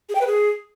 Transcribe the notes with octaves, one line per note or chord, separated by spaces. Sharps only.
G#4
G5
B4
G#4